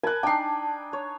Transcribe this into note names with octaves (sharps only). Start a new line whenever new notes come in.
A#4 G#5 A5 B5 F#6
D4 D#4 G5 C7
C#5